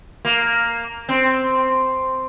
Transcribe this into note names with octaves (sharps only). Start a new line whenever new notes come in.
A#3
C4